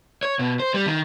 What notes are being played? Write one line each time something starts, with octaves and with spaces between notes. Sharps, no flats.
C#5
B2
C5
G3
D#3